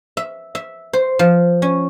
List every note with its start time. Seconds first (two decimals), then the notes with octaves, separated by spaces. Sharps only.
0.17 E5
0.55 E5
0.93 C5
1.19 F3
1.62 C#4